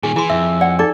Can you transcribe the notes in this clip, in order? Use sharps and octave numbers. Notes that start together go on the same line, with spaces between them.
A#2 D#3 G#4 G#5
E3 E4 G#4 C6
F2 E5 E6
D5 F#5
D#4 A4 D5 D6